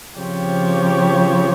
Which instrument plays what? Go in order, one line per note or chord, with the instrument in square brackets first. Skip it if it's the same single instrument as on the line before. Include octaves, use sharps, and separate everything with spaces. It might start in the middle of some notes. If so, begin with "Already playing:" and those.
[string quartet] C#3 F3 C4 G4 C#5